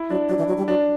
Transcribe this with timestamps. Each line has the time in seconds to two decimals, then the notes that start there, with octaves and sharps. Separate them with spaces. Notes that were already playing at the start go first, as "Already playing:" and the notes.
Already playing: E4
0.09 F#3 D4
0.29 F#3 D4
0.38 E3
0.48 F#3
0.57 G3
0.68 F#3 D4